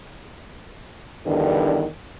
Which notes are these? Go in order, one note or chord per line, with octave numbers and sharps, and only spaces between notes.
E2 G2 D3 D#3